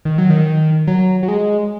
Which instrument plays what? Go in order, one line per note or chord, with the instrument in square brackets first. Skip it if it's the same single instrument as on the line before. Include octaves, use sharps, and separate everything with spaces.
[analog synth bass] D#3
F#3
D#3
F#3
F#3
G#3